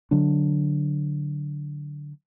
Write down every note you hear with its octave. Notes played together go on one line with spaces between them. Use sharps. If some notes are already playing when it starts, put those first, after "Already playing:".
D3 F#3 D4